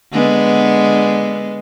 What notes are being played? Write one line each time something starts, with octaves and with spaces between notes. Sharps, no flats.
D3 G#3 B3